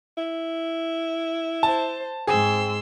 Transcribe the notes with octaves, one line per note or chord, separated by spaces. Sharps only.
E4
C5 A5
G#2 C4 G#4 C6 E6